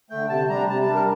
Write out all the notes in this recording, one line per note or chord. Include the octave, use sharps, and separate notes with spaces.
D3 A3 G5
C3 A5
G3 D4 A#5
C3 A5
A5
G3 D4
A#4